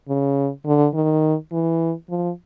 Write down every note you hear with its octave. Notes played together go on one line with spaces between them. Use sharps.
C#3
D3
D#3
E3
F3